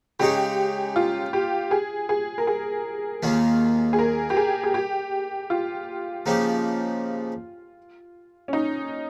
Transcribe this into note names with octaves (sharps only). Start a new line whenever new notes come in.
C#3 G#3 D#4 G4 G#4 C#5
F4
G4
G#4
G#4
A#4
G#4
D#2 D#3 A#3 F4
G#4
A#4
G4
G#4
G#4
G4
F4
C#3 F3 A#3 D#4 G4
C#4
D#4